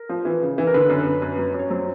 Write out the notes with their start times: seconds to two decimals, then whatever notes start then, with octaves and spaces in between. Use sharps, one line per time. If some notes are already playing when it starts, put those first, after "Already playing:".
Already playing: A#4
0.09 F3
0.25 E3
0.42 C#3
0.58 E3
0.67 A#4
0.74 D3 B4
0.89 F#2
1.07 F#2
1.22 F#2
1.38 F#3
1.54 F#2
1.59 C#5
1.70 F#3 C5